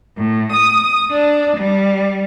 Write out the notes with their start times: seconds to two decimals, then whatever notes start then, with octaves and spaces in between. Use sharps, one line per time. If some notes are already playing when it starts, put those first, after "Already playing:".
0.17 A2
0.53 D#6
1.11 D4
1.56 G3